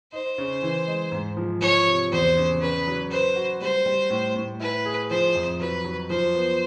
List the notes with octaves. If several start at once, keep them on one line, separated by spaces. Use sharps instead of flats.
D#4 C5
C#3
E3
G#3
G#2
F3
F3 C#5
C3
E2 C5
C#3
C#4 B4
F#3
B4 C5
F#4
G3 C5
G3
A2
A2
E4 B4
G#4
F3 C5
F2
F#3 B4
F#3
F3 C5
B3